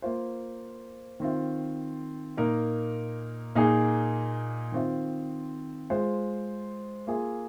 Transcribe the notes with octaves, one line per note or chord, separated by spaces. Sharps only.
A#3 F4 C5
D#3 C4 F4
A#2 A#3 D#4 A#4
A#2 A#3 D#4 G#4
D#3 C4 F4
G#3 F4 C5
A#3 F4 G#4